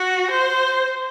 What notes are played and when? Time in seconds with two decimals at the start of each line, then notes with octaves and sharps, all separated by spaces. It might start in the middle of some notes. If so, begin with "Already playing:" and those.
Already playing: F#4
0.30 C5